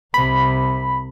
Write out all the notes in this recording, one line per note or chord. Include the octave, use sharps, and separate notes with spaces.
C2 C3 B5